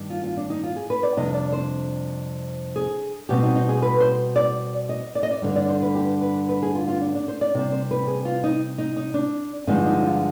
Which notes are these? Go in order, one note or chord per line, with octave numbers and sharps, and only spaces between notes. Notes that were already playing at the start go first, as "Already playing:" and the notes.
Already playing: G2 D#3 G3
F4
F4
D4
D#4
F4
G#4
B4
D5
F2 C3 G3 D4 D#5
D5
C5
G#4
B2 G3 C4 G4
D#4
D#4
G#4
B4
C5
D5
D#5
D5
D#5
D5
G2 D3 G3 D4
D5
C5
B4
G4
B4
B4
G#4
F4
F4
D4
D4
C5
D5
C3 G3 C4 D5
C5
B4
G#4
F4
D#4
D#4
D#4
D4
G2 D3 F3 G#3 D4 D#4
D#4
F4